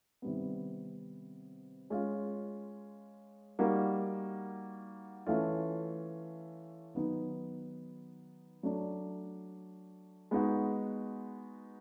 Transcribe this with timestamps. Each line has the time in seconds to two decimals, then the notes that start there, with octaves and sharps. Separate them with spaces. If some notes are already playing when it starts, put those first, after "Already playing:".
0.22 C3 D#3 G3 B3
1.90 G#3 C#4 F4
3.59 G3 A#3 D#4 F#4 A#4
5.27 E3 A3 C#4 F4
6.95 D#3 F#3 B3 D#4
8.63 F#3 A3 D4
10.31 G#3 B3 D#4 F#4